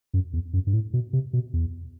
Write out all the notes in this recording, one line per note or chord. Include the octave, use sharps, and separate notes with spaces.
F#2
E2
F#2
G2
A2
B2
C3
B2
E2